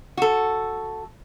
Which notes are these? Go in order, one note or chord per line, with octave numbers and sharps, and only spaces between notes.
F#4 A4